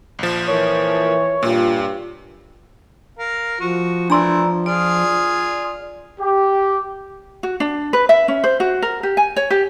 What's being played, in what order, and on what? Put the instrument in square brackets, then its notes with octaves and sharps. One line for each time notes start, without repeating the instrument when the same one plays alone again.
[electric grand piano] A#1 F3
[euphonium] E3 [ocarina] A#4 [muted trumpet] C#5
[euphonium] G2 [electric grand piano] A#2 [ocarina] F4
[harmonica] A#4 F5
[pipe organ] F3 [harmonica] F#4
[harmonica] E3 A3 [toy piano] D4 C6 E6 [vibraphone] D5 A#5
[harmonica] F4 G#4 [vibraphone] D5
[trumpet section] G4
[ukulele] F#4
D4
B4
E5
C#4
C5
F#4
A#4
G4
G#5
C#5
G4